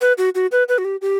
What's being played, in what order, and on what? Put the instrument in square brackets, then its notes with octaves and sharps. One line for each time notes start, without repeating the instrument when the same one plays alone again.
[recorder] B4
F#4
F#4
B4
B4
F#4
G4
G4